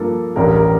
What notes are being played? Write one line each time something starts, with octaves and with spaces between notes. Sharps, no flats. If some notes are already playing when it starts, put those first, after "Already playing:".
Already playing: G2 F3 A#3 A4
A1 G2 D3 G3 A#4
A#4